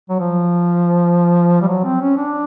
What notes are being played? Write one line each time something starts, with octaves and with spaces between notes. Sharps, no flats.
F#3
F3
G3
F#3
C4
C#4
D4